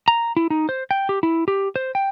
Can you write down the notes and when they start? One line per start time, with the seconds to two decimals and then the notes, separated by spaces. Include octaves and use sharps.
0.08 A#5
0.37 E4
0.50 D#4
0.69 C5
0.91 G5
1.09 G4
1.23 E4
1.48 G4
1.76 C5
1.95 G5